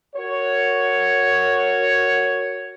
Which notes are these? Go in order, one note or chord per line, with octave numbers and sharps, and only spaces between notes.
F#4 A#4 C#5